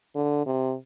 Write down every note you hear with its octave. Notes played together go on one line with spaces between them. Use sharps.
D3
C3